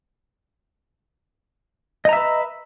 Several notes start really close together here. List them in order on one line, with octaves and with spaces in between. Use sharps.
D#5 A#5 E5 B4